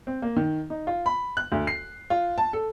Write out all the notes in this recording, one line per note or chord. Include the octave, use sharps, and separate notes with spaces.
C4
A#3
D#3
D#4
F4
B5
F#6
D2
C7
F4
A5
A4